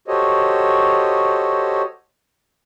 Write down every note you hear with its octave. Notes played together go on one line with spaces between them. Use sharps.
F#4 G4 A4 C5 C#5 D#5